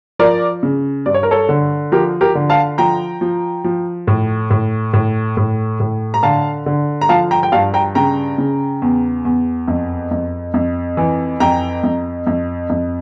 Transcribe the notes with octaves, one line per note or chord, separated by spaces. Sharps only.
F3 A#4 D5
C#3
G2 D5
C#5
A#4
A4 C#5
D3
F3 G4 A#4
G4 A#4
D3
F5 A5
F3 G5 A#5
F3
F3
A2
A2
A2
A2
A2
A#5
D3 F5 A5
D3
A#5
F3 F5 A5
G5 A#5
G5
G2 F5 A5
G5 A#5
C#3 G5 A#5
C#3
E2
E2
F2
F2
F2
E3
F2 G5 A#5
F2
F2
F2